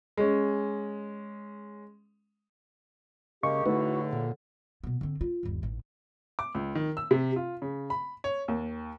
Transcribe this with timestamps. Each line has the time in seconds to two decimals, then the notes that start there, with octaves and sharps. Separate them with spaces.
0.17 G#3 C#4
3.43 C#3 G#3 A#3 G4 D#5 C#6
3.66 E2 A2 D3 A3 D#4 E4 F#4 B4
4.13 A#2
4.84 B2 B3
5.01 D3 C4
5.21 F4
5.43 G1 D#2
5.63 A1 G#2
6.39 D6
6.55 C#2
6.75 D#3
6.97 E6
7.11 C3
7.36 F4
7.62 C#3
7.90 B5
8.24 C#5
8.48 D#2